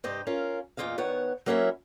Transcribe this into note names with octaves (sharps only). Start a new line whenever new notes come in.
G2 C3 C4 G4 D#5
C#4 F4 A#4 F5
E2 A#2 C#4 F4 D#5 F5
D#3 B3 C#5 F#5
F#3 A#3 C#4 E4 A#4 E5